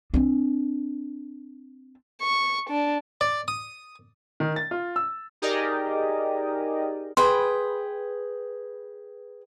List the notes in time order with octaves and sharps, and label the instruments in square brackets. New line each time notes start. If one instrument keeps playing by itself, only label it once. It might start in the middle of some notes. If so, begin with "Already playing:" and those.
[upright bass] C4 D4
[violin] C#6
D4
[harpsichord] D5
D#6
[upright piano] D#3
A6
F4
E6
[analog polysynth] D#4 G4 G#4 A#4 D5 D#5
[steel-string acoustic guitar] G#4 B4 G5 [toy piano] C6